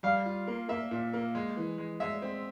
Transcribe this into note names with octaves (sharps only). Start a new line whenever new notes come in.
G3 F5
F4
A#3
A#3 E5
A#2
A#3
G#3
E3
G#3
G#3 E5
C4